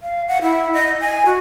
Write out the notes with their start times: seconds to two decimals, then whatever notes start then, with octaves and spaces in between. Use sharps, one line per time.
0.02 F5
0.28 F#5
0.42 E4
0.73 D#5
1.01 G#5
1.26 F#4